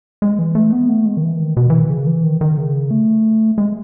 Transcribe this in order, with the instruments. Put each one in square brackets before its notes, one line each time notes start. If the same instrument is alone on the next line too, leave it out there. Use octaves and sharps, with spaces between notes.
[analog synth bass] G#3
E3
A3
B3
A3
G#3
D#3
E3
D#3
B2
E3
D#3
C#3
E3
D#3
D#3
C#3
A3
G#3